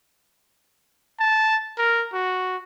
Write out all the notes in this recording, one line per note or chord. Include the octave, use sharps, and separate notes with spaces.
A5
A#4
F#4